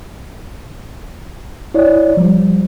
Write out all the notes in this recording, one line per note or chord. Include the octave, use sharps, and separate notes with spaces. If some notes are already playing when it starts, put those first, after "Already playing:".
E4 C#5 D5
F3 G3